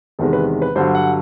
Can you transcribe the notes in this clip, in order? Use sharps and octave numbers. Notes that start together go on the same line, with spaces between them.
E2 C3 D#3 G#3 A4
B4
B4
G2 D3 F#3 C5
F#5